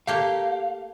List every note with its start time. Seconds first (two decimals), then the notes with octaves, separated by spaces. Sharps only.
0.07 A3 A#3 G4 F5